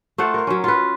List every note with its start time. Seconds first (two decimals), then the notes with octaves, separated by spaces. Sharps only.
0.18 A3 F4 C5 F#5
0.34 A#4 F5
0.47 F#3 C#4
0.64 F4 B4